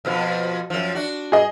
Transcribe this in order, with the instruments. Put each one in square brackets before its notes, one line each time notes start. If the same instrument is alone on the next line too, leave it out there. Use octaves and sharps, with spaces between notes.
[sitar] F2 B2 F3
F#2 F3
D4 F#4
[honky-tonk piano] G#4 D#5